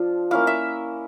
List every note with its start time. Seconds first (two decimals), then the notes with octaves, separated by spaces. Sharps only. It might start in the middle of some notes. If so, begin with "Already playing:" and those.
Already playing: F3 D4 F4
0.31 A#3 C#4 E4 F5
0.47 E5